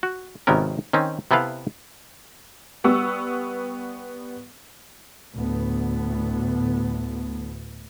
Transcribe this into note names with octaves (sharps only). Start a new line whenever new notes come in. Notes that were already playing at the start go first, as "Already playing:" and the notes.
F#4
G#1 C3 D#3 B3 C#4 A#4
D#3 C4 C#4
C3 B3 E4 A4 B4 F5
G3 B3 C#6 E6
D2 A2 B3